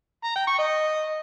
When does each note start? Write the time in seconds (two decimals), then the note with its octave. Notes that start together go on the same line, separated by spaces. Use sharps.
0.24 A#5
0.36 G5
0.47 C#6
0.59 D#5